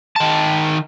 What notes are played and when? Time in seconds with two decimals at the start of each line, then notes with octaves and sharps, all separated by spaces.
0.16 D#3 A5